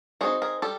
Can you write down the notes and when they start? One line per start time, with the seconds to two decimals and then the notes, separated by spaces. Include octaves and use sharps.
0.21 G3 C4 D#4 F#4 G#4
0.42 G#4 A#4
0.62 G3 G4 A4